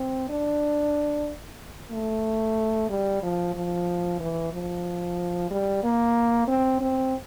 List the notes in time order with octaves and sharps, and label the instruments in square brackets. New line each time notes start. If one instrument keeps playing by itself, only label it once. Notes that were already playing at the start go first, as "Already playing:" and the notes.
Already playing: [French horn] C4
D4
A3
G3
F3
F3
E3
F3
G3
A#3
C4
C4